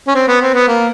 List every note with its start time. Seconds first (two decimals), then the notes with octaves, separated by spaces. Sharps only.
0.08 C#4
0.15 C4
0.28 B3
0.42 C4
0.54 B3
0.68 A#3